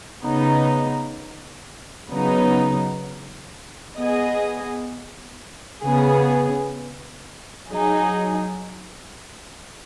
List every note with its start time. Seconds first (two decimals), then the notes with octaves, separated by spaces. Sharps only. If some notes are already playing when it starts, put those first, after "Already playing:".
0.23 C#3 B3 D#4
2.10 C#3 F#3 B3 D#4
3.96 B3 G#4 D#5
5.83 C#3 B3 G#4
7.70 F#3 D#4 G#4